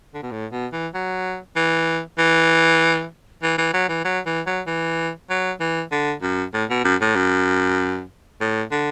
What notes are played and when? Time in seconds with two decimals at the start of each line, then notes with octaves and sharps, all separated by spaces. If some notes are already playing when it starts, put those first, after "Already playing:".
0.14 D3
0.23 B2
0.32 A2
0.52 B2
0.73 E3
0.94 F#3
1.56 E3
2.18 E3
3.43 E3
3.58 E3
3.74 F#3
3.89 E3
4.05 F#3
4.26 E3
4.47 F#3
4.67 E3
5.30 F#3
5.60 E3
5.92 D3
6.22 F#2
6.54 A2
6.70 B2
6.84 F#2
7.01 A2
7.15 F#2
8.41 A2
8.71 D3